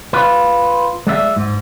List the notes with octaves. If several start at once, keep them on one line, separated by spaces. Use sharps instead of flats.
F4 B4
G#3 D5 E5
G#2